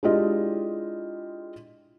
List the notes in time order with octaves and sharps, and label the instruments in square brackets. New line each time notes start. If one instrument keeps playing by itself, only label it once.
[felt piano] G#3 D4 E4 F4 G4 D#5